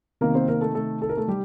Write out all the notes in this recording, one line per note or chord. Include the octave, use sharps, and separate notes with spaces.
C3 D#3 A#3 A#4
C4 C5
A#3 A#4
A3 A4
A3 A4
A4
A#4
A3 A4
G3 G4